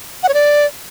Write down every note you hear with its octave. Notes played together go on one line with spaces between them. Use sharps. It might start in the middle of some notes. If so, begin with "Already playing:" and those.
F#5
C#5
D5